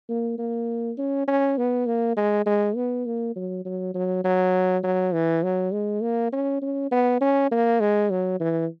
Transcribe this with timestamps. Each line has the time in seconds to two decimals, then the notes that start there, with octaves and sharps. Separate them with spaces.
0.09 A#3
0.38 A#3
0.98 C#4
1.27 C#4
1.58 B3
1.87 A#3
2.17 G#3
2.46 G#3
2.76 B3
3.06 A#3
3.36 F#3
3.65 F#3
3.94 F#3
4.24 F#3
4.84 F#3
5.13 E3
5.43 F#3
5.73 G#3
6.02 A#3
6.33 C#4
6.62 C#4
6.91 B3
7.21 C#4
7.51 A#3
7.80 G#3
8.10 F#3
8.40 E3